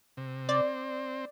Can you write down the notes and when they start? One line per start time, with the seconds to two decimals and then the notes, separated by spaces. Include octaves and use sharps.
0.17 C3
0.49 C4 D5